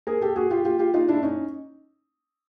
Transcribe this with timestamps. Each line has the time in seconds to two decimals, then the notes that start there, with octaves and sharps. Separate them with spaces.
0.07 G#4 A#4
0.21 G4 A4
0.36 F#4 G#4
0.51 F4 G4
0.65 F4 G4
0.79 F4 G4
0.94 D#4 F4
1.08 D4 E4
1.23 C#4 D#4